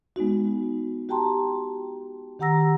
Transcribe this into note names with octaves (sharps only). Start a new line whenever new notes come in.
G#3 B3 D#4 F#4
F#4 G4 G5 A5 A#5 C6
D#3 G4 F#5 A#5 E6 A#6